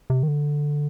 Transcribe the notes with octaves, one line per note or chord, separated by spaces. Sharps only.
C3
D#3
D3